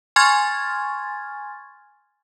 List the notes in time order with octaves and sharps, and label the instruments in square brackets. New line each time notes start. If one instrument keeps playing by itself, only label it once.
[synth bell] G#5 C6 C#6 F6 G#6 A6